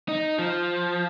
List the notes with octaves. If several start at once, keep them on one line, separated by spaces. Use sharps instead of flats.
D#4
F3